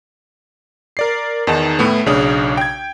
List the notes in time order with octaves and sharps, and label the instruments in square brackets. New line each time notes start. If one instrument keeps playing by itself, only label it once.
[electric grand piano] A#4 D5 C7
E2 D#3 D#4 A5
A2 A3 B3
B1 C#3 C#4 D4 D#6
G5 G#6